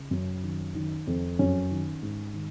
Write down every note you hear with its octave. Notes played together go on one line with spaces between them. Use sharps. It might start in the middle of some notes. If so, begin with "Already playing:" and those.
Already playing: C#3
F#2 C#4
D#3
D#3
F2
F#2 C#4
D#3
G#2
D#3